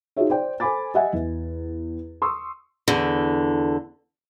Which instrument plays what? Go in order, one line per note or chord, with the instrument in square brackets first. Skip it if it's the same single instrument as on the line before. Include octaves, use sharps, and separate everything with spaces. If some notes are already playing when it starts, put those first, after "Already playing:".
[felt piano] D#4 F4 F#4 G#4 C#5 E5
C5 D5 G5
A4 C5 G#5 B5 D6 A6
G4 D#5 E5 F#5 G#5
E2
C6 C#6 D#6 E6
[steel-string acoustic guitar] E2 D3